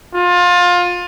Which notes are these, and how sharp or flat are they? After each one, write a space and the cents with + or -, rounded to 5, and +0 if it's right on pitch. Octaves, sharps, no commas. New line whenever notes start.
F4 +25